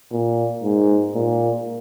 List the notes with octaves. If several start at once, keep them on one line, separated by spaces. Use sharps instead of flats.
A#2
G#2
A#2